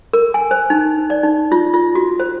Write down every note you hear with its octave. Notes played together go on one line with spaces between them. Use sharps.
A#4
G#5
C5
D#4
D5
D#4
F4
F4
F#4
C5